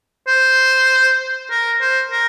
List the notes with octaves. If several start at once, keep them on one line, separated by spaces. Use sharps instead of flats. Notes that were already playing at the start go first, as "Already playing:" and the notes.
C5
A#4
C5
A#4